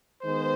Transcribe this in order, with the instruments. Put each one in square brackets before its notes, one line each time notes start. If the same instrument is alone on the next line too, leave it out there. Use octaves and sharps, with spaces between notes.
[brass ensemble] D#3 G#3 B3 C5